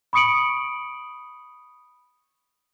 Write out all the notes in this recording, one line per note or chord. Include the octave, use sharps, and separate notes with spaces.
B5 C#6 D#6 C#7 D7 F#7